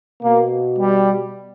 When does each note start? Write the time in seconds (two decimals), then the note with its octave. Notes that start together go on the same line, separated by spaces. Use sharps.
0.22 B2 A#3
0.78 G3